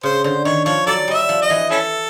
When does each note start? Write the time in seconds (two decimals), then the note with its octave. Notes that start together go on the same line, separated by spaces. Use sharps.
0.03 C#3 C5
0.24 D3 C5
0.45 D#3 C#5
0.66 F3 C#5
0.87 F#3 A4 D5
1.08 G3 D#5
1.14 E5
1.29 F3
1.42 D#5
1.50 E3
1.70 C#4 E4 A4